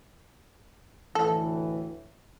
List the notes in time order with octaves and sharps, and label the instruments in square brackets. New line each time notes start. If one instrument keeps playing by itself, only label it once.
[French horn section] D2 A2 E3 [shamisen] A4